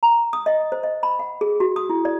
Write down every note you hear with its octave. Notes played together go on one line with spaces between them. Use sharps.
A#5
D#6
D#5
C5
D#5
B5
F#5
G#4
F#4
D#6
E4
D5